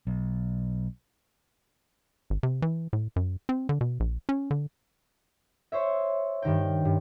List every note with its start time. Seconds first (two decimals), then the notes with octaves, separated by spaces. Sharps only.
0.07 B1
2.30 G#1
2.43 C3
2.62 E3
2.93 A2
3.16 F#2
3.49 C4
3.69 D3
3.81 B2
4.00 A#1
4.29 C#4
4.51 D3
5.72 C5 C#5 E5
6.42 G2 D#3 G5
6.85 G2